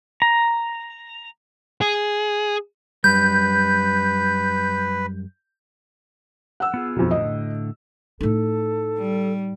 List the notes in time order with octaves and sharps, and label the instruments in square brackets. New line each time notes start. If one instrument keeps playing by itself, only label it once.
[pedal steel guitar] A#5
[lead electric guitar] G#4
[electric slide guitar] F#2 G3 [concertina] B4 [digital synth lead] G6
[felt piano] F#5 E6
[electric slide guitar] B3 F4 G#4
[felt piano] B1 F2
[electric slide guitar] A2 D3 [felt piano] D#5
[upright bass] A2 D#4 [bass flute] A4
[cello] G3